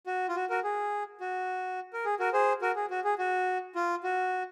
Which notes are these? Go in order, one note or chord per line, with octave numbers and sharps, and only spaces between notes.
F#4
F4
F#4
F#4 A#4
G#4
F#4
A#4
G#4
F#4 A#4
G#4 C5
F#4 A#4
G#4
F#4
G#4
F#4
F4
F#4